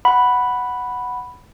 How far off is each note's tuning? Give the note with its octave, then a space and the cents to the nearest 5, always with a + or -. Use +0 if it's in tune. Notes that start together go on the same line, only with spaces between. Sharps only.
F#5 +0 B5 +0